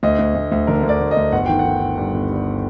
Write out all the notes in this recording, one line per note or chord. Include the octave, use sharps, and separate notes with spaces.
D2 D#5
D2
D2
D2
D3 A#4
D2
D5
D2
D#5
D2
G1 F#5
D#3 G5
F#5
D#3
D#3
G2
G1
G3